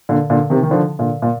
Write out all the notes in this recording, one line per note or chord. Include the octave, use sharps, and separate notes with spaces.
A#2 D3
A#2 D3
C3 D#3
D#3
D3 F3
A#2 D3
A#2